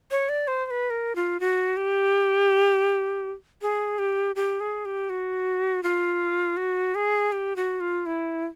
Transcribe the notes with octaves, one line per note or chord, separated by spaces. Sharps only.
C#5
D5
C5
C5
B4
A#4
F4
F#4
G4
G#4
G4
G4
G#4
G4
F#4
F4
F#4
G#4
G4
F#4
F4
E4